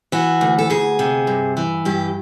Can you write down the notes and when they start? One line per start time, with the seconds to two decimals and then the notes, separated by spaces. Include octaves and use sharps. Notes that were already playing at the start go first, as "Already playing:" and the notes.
0.12 E3 F#4
0.41 D2
0.58 A4
0.70 D2 G#4
0.99 C3
1.27 G2
1.57 E3
1.85 G2 G4